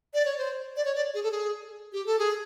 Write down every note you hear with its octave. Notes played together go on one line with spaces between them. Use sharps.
D5
C#5
C5
D5
C#5
D5
G#4
A4
G#4
G4
A4
G#4